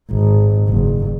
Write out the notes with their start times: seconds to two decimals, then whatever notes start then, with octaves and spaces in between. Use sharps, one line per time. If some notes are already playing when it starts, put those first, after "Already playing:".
0.11 G#1
0.68 F#1